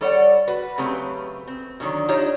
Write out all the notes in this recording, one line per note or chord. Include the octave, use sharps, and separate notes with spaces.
G3 A4 C#5 D5 F5 F#5
F#4 B4
C#3 F#3 A3 C4 G4 B4
C4
B2 D3 D#3 F#3
D4 D#4 F4 G4 C#5 D#5